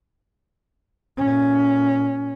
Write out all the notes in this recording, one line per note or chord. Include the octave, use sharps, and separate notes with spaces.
A#2 C#4